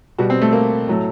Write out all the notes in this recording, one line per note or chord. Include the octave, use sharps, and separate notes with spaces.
B2 G3 F#4
C4
A3
A#3
A2 F#3 A3